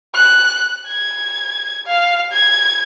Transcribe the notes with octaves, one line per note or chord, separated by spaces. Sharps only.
F#6
G#6
F5
G#6